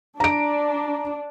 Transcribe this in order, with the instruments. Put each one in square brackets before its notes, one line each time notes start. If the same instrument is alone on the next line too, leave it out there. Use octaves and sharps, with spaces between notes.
[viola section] D4 [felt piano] A#5 D7